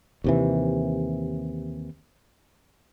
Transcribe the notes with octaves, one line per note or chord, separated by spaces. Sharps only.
D#2 C3 E3